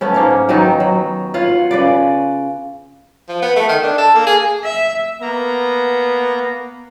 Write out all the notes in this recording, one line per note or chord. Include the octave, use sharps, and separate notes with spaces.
A3 B3 C#4
G#2 A#3 C#5
D#3 F#3 B3 D#4
F#3
F4 B4 C#5 F#5
C#3 B4 D5
F3
B3
A3
D#3
D4
A4
A#3
G#4
E5
A#3 B3 A#5